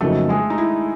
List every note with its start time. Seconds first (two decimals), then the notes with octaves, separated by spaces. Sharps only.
0.01 F2 C#3 F#3 A3 A#3 D#4 A4
0.29 G#3 G#4
0.50 D#4
0.58 E4